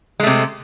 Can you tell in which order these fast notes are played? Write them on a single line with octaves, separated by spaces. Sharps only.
G#3 A3 C3